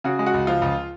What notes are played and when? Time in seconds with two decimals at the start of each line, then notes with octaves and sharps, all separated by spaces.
0.04 C#3 F#4
0.19 G#3
0.26 F#4
0.34 C#2
0.47 F3 F4
0.62 C#2